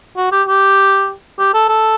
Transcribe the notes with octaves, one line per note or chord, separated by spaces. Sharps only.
F#4
G4
G4
G4
A4
A4